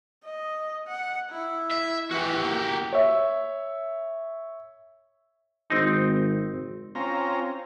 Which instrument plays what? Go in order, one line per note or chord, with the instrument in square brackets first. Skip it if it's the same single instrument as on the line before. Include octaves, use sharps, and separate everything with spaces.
[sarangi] D#5
F#5
E4
[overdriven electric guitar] E5
[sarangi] E3 [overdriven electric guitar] F#4 G4
[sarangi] A#3
[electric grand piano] C#5 E5
[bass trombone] G#1 [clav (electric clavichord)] C4 D#4
[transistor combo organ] C4 C#4 F4 A#5